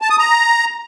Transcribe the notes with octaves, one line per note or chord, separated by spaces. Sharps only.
A5
D#6
A#5